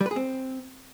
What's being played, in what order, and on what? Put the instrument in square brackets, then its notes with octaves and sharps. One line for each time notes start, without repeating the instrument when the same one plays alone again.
[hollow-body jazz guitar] G3
B4
G#4
C4